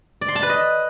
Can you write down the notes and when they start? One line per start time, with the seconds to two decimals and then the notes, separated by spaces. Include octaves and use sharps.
0.21 D5
0.28 C6
0.35 A5
0.43 B4
0.50 D#5